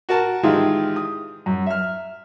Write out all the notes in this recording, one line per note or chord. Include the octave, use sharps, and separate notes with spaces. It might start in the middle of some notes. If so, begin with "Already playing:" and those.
F#4 A#4 A5
D#3 E3 G#3 E4 F4 G4
D#6
F#2
E5 F6